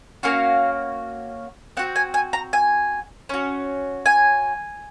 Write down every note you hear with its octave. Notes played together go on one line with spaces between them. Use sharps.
A#3 C#4 F#4 F5
C4 F#4 F#5
G#5
G#5
A#5
G#5
C#4 F#4
G#5